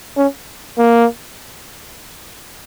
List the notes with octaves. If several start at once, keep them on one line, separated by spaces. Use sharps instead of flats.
C#4
A#3